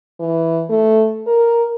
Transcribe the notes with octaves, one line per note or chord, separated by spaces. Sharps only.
E3
A3
A#4